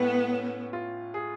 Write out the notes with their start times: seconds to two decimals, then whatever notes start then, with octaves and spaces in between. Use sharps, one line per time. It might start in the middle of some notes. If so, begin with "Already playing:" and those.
Already playing: A2 G#3 B3 C#4
0.31 C#4
0.73 F4
1.14 G#4